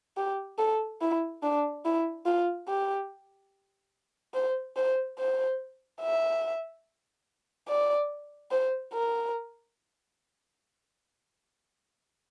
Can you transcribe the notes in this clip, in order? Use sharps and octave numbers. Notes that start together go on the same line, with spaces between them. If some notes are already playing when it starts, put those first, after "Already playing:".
G4
A4
E4
D4
E4
F4
G4
C5
C5
C5
E5
D5
C5
A#4